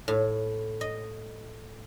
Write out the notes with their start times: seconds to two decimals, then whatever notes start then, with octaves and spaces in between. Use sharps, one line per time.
0.08 A2
0.81 D#5